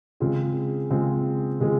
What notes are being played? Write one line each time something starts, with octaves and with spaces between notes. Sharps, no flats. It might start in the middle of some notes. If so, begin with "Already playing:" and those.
C#3 G#3 C4 F4 G#4
C#3 G#3 C4 F4 G#4
C#3 G#3 C4 F4 G#4